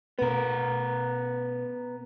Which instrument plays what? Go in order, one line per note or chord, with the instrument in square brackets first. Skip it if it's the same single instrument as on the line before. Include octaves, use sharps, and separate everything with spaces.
[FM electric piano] B2 B4 [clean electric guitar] B3 A#4